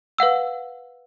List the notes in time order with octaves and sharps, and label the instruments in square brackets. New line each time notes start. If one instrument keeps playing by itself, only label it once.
[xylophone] B4 F5 F#5 E6